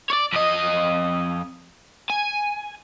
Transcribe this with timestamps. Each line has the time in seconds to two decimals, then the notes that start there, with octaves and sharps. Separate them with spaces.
0.10 C#5 D5
0.33 F2 D#5
2.10 G#5